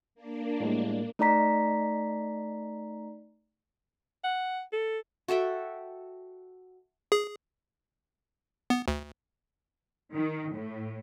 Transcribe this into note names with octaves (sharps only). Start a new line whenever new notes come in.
A#3 D4
A2 G3 G#3
A3 D#4 D5 A#5 B6
F#5
A4
F#4 A4 E5 G5
G#4
B3
D2
D#3
A2